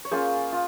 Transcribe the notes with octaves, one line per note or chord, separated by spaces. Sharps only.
C#5
A#3 C#4 F4 G#4 C5
F4